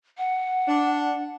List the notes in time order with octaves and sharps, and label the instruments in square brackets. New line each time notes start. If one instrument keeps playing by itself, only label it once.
[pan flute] F#5
[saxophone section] D4